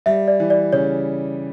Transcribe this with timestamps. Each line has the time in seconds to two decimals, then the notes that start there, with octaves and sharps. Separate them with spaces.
0.06 G3 E5
0.28 D5
0.40 E3
0.50 D5
0.73 C#3 C#5